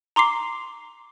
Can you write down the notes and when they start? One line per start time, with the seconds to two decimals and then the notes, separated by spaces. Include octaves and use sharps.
0.16 A#5 C6 D6 C7